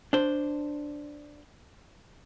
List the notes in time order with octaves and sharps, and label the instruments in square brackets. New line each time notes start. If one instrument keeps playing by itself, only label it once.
[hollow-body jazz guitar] D4 C5